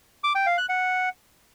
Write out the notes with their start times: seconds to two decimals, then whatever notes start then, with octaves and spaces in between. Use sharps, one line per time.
0.24 D6
0.35 G5
0.46 F5
0.58 F#6
0.69 F#5